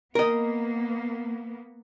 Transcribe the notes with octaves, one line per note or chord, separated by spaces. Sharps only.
A#3 B3 A#4 D#5